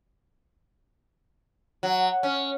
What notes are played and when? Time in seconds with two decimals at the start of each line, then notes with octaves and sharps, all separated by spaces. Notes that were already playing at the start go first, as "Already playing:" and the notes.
1.83 F#3
2.23 C#4